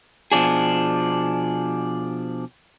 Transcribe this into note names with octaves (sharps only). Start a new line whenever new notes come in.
B2 F3 D4 G#4